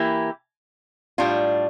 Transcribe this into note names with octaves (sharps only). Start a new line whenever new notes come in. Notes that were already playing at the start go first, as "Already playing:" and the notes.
Already playing: E3 A#3 E4 G4
A2 G3 D4 F4